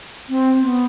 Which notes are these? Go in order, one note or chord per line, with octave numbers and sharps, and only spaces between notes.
C4
B3